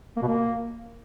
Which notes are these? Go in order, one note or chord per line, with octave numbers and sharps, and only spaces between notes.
A#3
B2
A#3